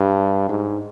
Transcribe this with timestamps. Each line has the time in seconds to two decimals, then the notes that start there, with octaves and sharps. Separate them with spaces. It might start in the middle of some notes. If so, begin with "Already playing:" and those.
Already playing: G2
0.49 G#2